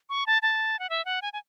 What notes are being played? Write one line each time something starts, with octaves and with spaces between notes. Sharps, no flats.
C#6
A5
A5
F#5
E5
F#5
G#5
G#5